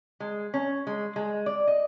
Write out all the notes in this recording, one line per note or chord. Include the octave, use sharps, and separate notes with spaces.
G#3
C#4
G#3
G#3
D5
D#5